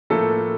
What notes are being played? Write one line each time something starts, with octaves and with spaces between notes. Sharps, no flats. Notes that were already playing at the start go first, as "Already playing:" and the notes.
A2 F3 A3 A#3 A4